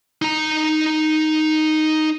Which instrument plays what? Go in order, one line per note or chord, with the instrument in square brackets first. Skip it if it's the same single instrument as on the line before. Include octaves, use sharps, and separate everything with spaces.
[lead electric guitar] D#4 A#5